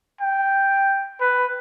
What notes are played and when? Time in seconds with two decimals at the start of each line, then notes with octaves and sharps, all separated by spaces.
0.21 G5
1.21 B4